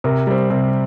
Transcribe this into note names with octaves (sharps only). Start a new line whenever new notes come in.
C3 A#4
G3 C4
C3